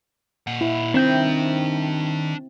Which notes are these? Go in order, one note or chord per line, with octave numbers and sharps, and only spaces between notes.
A#2 F#5
E4
D#3 C4 D4 E5 G5 G6